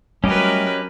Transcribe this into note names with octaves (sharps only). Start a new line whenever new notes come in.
F#3 G3 A3 C#4 G4 A#4 B4 D#5